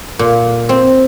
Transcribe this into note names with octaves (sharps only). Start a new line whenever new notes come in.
A#2
C4